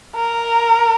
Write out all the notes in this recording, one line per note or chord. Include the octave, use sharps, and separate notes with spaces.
A#4